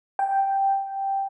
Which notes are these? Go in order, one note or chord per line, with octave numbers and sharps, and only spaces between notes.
G5